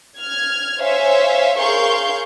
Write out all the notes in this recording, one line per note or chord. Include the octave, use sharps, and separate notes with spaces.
F6 G#6
C5 C#5 E5 F5 G#5
G#4 A#4 F5 C6 C#6 G6